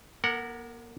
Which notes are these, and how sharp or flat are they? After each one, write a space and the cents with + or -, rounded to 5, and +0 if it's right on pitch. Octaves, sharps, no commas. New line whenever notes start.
A#3 +45 A#4 -25 F#5 +0